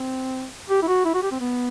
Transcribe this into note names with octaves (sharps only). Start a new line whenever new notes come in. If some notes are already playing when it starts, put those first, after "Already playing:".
Already playing: C4
G4
E4
F#4
E4
F#4
G4
C4
B3